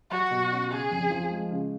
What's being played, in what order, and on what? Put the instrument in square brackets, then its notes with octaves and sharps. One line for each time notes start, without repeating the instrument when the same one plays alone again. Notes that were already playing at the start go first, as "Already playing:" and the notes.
[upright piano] F#3 [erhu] F#4
[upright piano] B2
C#4
[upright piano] C#3 [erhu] G#4
[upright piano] F2
F3
G#3
C#3